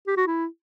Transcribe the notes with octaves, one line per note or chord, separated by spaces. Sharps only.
G4
F#4
E4